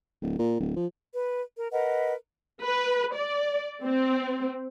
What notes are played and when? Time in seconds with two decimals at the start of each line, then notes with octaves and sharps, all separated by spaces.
0.22 D1
0.39 A#2
0.60 D1
0.76 F3
1.12 B4
1.56 A#4
1.72 A#4 B4 D#5 F#5
2.63 B4
3.15 D5
3.84 C4